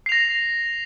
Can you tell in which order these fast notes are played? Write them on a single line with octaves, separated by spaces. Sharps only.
C7 F7 A#6